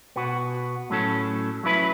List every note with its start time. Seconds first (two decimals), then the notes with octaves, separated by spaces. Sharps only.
0.16 B2 B3 F#4
0.90 A2 F#3 C#4 A4
1.64 F#3 C#4 E4 B4